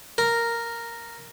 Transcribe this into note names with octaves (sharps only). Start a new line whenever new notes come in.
A#4